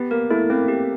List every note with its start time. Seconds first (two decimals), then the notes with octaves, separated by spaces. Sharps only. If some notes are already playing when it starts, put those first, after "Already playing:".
Already playing: B3 G4
0.11 A#3 A#4
0.30 A3 E4
0.50 A#3 C4
0.68 G4